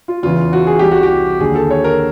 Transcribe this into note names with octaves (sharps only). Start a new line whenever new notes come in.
F4
E2 C#3 E3 F4
F#4
G#4
C2 C3 E3 G4
F#4
G4
D#2 D3 G#4
A4
C#5
A#4